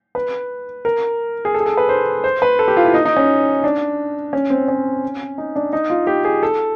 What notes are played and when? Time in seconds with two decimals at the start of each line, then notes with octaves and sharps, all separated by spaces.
0.15 B4
0.85 A#4
1.45 G#4
1.55 A4
1.60 G#4
1.66 A4
1.77 B4
1.89 C5
2.24 C5
2.42 B4
2.59 A4
2.68 G4
2.77 F4
2.85 E4
2.94 D#4
3.05 D#4
3.16 C#4
3.64 D4
4.33 C#4
4.50 C4
4.68 C#4
5.38 D#4
5.56 D4
5.73 D#4
5.90 F4
6.07 G4
6.25 G#4
6.43 A4